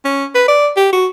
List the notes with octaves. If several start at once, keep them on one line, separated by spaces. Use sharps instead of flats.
C#4
B4
D5
G4
F#4